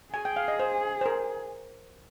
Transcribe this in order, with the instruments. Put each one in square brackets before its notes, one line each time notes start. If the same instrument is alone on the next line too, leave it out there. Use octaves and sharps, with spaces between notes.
[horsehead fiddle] G#4 [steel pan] G#5
[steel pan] G5
F5
D#5
C5
C5
A#4